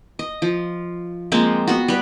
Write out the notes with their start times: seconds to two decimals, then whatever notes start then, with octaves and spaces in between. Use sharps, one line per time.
0.19 D#5
0.42 F3
1.32 F3 G#3 A#3 C4
1.68 B3 F#4
1.88 G3 B4